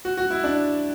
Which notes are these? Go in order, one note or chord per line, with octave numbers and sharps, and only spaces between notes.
F#4
F#4
E4
D4